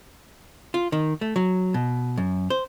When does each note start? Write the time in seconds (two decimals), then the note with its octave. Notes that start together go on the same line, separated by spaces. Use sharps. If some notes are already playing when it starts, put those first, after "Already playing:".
0.74 F4
0.92 D#3
1.21 A3
1.36 F#3
1.74 B2
2.17 F#2
2.50 C5